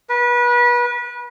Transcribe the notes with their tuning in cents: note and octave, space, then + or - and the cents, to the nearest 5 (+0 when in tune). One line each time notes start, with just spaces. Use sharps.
B4 -30